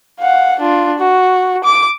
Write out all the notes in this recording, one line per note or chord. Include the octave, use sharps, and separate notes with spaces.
F5 F#5
D4 F4
F#4
D6